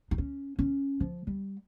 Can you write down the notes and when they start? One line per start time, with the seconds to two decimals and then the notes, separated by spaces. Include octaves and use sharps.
0.11 D#4
0.18 C#4
0.59 C#4
1.00 F3
1.27 G3